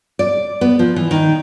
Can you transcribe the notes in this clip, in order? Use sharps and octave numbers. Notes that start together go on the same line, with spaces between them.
D5
B3
F3
E3
D#3